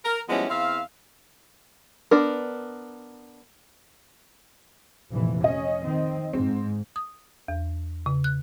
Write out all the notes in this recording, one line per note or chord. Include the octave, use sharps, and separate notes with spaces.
A#4
F3 G3 G#3 B3 C#4 E4
E2 C4 E5 F5
B3 D4 A#4
F1 A#2 E3
C#4 D#5
D#3 C4
G#2 C4
D#6
E2
C#3
F#6